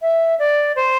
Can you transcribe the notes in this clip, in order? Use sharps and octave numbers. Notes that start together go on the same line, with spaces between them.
E5
D5
C5